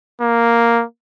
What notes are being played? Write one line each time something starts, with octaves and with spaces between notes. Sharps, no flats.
A#3